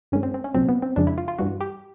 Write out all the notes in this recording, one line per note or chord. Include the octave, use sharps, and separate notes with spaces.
G2 D#3 G#3 C#4
C4
C4
C#4
C2 A#2 F#3 C4
B3
C4
F2 C#3 F3 G#3 D4
E4
F4
F4
G2 E3 G3 F#4
G4